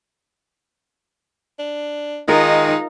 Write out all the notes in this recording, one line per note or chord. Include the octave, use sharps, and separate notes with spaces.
D4
D#3 G#3 D#4 F4 A#4